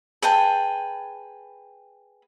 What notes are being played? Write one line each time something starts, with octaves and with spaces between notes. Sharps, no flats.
G#4 B4 G5 A5